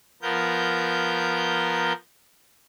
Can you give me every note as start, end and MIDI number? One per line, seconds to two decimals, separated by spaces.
0.22 1.93 53
0.22 1.93 59
0.22 1.93 70
0.22 1.93 91